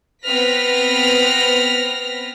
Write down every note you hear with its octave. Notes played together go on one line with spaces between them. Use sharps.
B3 C4 B4 F6 A#6 B6